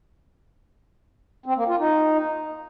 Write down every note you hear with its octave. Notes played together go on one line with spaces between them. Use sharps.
C4
A#3
F4
D#4